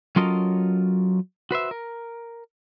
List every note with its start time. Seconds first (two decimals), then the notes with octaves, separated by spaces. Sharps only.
0.16 F#3 C#4 F4 A4 A#4 D#5
1.51 F#4 B4 C5 E5
1.71 A#4